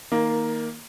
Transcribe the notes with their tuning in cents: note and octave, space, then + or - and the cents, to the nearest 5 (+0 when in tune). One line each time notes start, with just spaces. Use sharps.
D#3 +20 A#3 +0